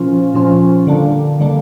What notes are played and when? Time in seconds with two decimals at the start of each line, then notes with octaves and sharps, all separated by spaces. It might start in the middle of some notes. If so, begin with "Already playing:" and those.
Already playing: A#2 F3 C#4 F4
0.34 A#2 F3 C#4 F4
0.87 D3 G3 A#3 D4
1.40 D3 G3 A#3 D4